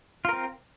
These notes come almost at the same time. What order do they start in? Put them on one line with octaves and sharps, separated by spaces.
F4 A#4 C4